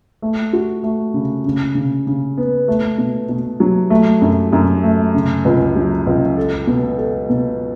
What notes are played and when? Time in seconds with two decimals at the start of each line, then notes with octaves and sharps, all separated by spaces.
0.22 A3
0.53 F#4
0.84 A3
1.14 C#3
1.45 C#3
1.75 C#3
2.07 C#3
2.38 B3
2.68 A3
2.98 B2
3.29 B2
3.60 F#3
3.90 A3
4.22 F#2
4.53 F#2
4.84 A3
5.14 C#3
5.45 C#2
5.76 F#3
6.07 C#2
6.37 A4
6.67 B2
6.98 A4
7.29 B2